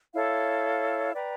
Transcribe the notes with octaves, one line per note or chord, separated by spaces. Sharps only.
E4 A4 C#5 F5
B4 D5 G5 A#5